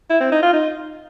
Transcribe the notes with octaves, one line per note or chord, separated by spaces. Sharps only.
E4
C4
D#4
F4
D#4